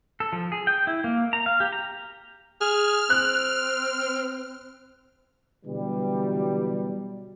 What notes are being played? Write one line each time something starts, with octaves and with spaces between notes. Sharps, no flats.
A4
F3
G#4
G5
E4
A#3
A#5
F5
G4
A#5
G#4 F6
C4 F#6
B2 D3 E3 F#3 G3